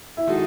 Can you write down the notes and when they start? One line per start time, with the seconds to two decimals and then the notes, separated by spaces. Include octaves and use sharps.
0.17 E4
0.27 D#3 G#3 D#4 F#4 A4